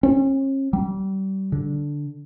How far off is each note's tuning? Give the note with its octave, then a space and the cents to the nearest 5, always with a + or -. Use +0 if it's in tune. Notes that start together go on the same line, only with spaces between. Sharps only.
C#4 -40
G3 -30
D3 -5